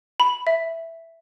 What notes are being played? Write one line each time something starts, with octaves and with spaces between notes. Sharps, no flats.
B5
E5